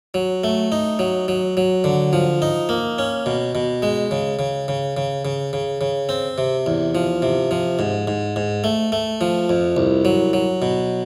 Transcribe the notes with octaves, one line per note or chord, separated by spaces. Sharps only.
F#3
A3
D#4
F#3
F#3
F#3
D3
F3
D#4
A#3
C#4
B2
B2
G#3
C#3
C#3
C#3
C#3
C#3
C#3
C#3
C4
C3
E2
F3
C3
F3
G#2
G#2
G#2
A3
A3
F3
F2
C2
F#3
F#3
B2